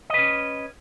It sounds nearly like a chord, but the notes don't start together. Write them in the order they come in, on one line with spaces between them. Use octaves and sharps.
D#5 B4 C#4